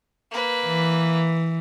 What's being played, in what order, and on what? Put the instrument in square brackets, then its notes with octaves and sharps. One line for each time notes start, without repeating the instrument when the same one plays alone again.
[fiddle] A#3 B4
[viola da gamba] E3